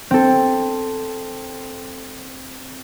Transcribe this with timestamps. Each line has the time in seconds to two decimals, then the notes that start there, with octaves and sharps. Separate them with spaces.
0.11 C4 A4